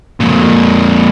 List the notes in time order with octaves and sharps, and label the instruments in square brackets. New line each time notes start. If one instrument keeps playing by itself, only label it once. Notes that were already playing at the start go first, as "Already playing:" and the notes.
[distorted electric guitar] F2 A#2